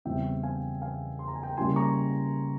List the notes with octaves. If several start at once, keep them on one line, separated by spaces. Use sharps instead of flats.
E2 C#3 G3 C4 E4 E5 G5
F5 G#5
F5 G#5
C6
A#5
G#5
G5 A#5
C#3 G3 A#3 C#4 E4 G#5 C6
A#5 C#6